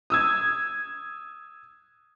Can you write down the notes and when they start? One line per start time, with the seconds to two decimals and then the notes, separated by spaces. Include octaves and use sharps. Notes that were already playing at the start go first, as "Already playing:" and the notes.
0.10 D#6 E6 G#6